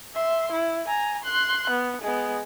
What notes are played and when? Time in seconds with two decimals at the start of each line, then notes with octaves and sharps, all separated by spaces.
0.14 E5 C6
0.51 E4
0.88 G#5 A#5
1.24 C6 F#6
1.70 B3
2.02 G#3 B3